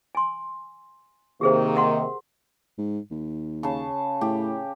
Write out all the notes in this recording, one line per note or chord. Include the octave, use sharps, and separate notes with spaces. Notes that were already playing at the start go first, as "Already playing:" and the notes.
G#5 C6
C3 D#3 A#3 G4 G#4 C5
A#4 F#5 C6
G#2
D#2
C#3 A5
A2 G4